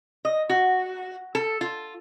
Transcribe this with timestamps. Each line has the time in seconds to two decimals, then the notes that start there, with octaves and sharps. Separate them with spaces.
0.25 D#5
0.49 F#4
1.35 A4
1.61 F4